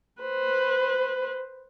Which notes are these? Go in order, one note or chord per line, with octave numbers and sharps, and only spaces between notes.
B4 C5